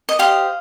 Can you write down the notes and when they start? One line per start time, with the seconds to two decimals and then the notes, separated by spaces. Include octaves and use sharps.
0.09 D#5
0.19 G4 C5 D#5 F5